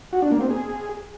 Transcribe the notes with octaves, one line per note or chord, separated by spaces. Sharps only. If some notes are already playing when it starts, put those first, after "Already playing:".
F#4
D4
A#3
C4
G#4